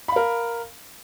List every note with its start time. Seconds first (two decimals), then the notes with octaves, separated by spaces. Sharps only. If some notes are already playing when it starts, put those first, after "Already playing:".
0.08 B5
0.12 F5
0.16 A#4